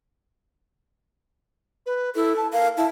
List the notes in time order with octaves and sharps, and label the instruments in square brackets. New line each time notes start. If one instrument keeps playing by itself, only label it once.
[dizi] B4
[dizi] E4 [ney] A4
[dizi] A5
[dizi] A#4 [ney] F5
[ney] E4 [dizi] A5